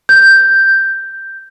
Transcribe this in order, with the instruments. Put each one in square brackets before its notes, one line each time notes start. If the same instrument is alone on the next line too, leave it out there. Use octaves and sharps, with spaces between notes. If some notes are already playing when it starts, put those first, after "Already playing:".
[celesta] G6